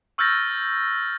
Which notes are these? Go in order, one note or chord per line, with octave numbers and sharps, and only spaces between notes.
C#6 E6 F6 G6 A6 A#6